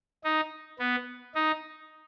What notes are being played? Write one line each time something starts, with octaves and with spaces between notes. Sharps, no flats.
D#4
B3
D#4